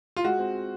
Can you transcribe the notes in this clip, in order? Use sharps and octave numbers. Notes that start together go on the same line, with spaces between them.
F4
G#3 F#4
C4